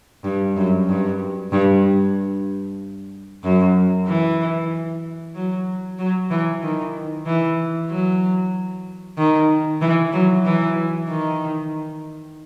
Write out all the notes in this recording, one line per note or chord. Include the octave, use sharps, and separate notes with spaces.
G2
F#2
G2
G2
F#2
E3
F#3
F#3
E3
D#3
E3
F#3
D#3
E3
F#3
E3
D#3